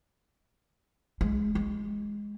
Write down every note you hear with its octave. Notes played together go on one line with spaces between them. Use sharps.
G#3
G#3